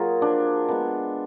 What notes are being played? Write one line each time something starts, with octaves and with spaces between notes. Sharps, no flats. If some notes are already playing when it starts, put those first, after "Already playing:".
Already playing: F#3 A#3 F4 G#4 A#4
F3 D4
G#3 B3 D4